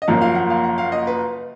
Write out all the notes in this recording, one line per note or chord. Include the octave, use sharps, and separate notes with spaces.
D#5
F#1 F#2 F3 A#3 F5
F5
F#5
F5
F#5
F5
D#5
B4